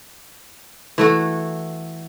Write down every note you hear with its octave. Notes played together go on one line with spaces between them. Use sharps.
E3 A3 F#4